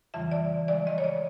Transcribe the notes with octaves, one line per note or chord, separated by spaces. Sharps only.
F2 C#3 E3 G3 E5
D5
F2 C#3 F3 G#3 D5
D#5
C#5
D5